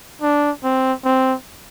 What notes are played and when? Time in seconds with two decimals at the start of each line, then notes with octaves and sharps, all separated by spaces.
0.22 D4
0.64 C4
1.05 C4